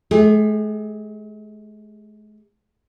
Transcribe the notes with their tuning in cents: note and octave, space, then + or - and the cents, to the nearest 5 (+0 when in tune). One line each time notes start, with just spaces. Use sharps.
G#3 +45 G#4 -40